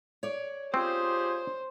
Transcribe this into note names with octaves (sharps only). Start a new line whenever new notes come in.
C#5 D5
C4 C#4 F4 G4 G#4 C5